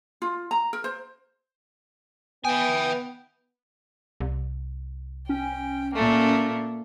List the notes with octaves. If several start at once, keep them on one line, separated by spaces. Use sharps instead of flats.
F4
A#5
A#4
C5
B3 E5 G5 G#5 D#6
C2
C#4 G5
A#2 A3 A#3